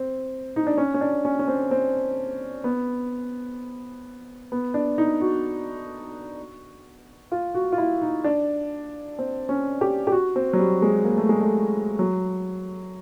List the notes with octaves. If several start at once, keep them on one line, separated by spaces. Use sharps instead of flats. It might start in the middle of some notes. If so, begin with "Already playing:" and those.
Already playing: C4
D#4
D4
C#4
C#4
D4
C#4
C#4
C4
C4
B3
B3
D4
D#4
F#4
F4
F#4
F4
E4
D#4
D4
C4
C#4
G4
G4
F#4
C4
F#3
G3
G#3
A#3
A3
G#3
A3
F#3